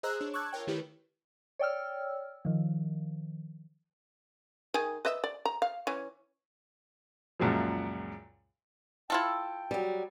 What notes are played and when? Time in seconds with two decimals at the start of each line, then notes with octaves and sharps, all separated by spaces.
0.03 G#4 C5 D#5 A#5 E6 F#6
0.20 D4 C#5
0.33 A5 C#6 D6 E6 F#6 G#6
0.53 F4 A#4 C#5 G5
0.67 D#3 A3 E4 G4 B4
1.59 C#5 D5 G5 E6 F6
2.45 D#3 F3
4.74 D#3 G#4
5.05 B4 D#5 E5
5.24 D5
5.45 A#5
5.62 F5
5.87 E3 C#4
7.40 C#2 F#2 A#2 C#3 F3
9.10 E4 F4 A4 G5
9.71 F#3 G3